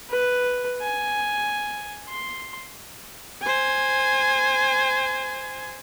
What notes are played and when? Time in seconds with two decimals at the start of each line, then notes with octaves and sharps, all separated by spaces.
0.10 B4
0.82 G#5
2.09 C6
3.42 C5 G#5